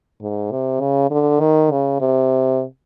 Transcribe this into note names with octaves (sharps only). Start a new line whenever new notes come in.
G#2
C3
C#3
D3
D#3
C#3
C3